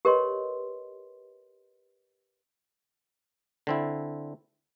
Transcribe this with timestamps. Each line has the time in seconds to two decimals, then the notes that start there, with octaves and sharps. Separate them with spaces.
0.05 G4 A#4 B4 C#5 D#5 C6
3.67 D3 C4 E4